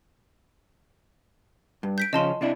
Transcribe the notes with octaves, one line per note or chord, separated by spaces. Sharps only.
G2
G6 B6 D7
C#3 F3 C#4 D#5 A5 C6
C3 D4 E4